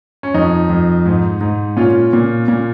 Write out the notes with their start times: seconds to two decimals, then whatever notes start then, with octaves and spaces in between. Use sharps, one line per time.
0.23 C#4
0.34 F2 D#4
0.69 F2
1.06 G#2
1.41 G#2
1.77 A#2 C#4 F4
2.13 A#2
2.48 A#2